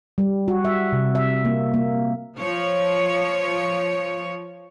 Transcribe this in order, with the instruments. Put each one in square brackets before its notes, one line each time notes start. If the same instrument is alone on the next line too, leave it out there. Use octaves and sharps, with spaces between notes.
[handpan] G3
F#4
E5
C3
E5
A#3
A#3
[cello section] F3 C#5